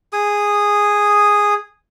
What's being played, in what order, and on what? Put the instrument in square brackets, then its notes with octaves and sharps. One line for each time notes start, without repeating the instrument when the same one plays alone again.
[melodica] G#4 D#6